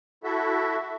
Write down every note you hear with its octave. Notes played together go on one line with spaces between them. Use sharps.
E4 F#4 A4 E5